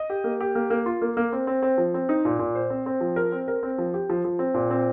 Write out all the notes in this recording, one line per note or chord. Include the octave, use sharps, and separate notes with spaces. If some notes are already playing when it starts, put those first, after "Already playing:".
Already playing: D#5
G4
A#3
G4
A#3
A#3
F4
A#3
A#3
C4
C4
C4
F3
C4
D#4
A#2
A#2
C5
C4
C4
F3
A#4
C4
A#4
C4
F3
G4
F3
F3
C4
A#2
C4